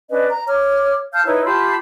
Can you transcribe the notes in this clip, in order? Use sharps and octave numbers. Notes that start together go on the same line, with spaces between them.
C#4 D4 B4 D#5
A#5
C#5 D6 F6
F5 A5 F6 G6
D#4 E4 B4 C#5
F4 G4 A5 B5